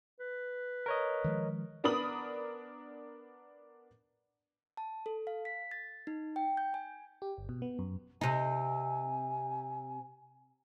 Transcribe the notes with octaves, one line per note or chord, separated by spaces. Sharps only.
B4
A#4 C#5 D#5
D#3 F3 G#3
B3 D4 A#4 B5 D#6 F#7
A5
A4
F5
B6
A6
D#4
G5
G6
G#5
G4
G1
B2
B3
F#2
C3 D#4 G#5